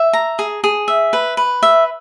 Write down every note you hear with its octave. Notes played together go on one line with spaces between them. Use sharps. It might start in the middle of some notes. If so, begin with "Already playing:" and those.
Already playing: E5
A#5
G#4
G#4
E5
B4
B4
E5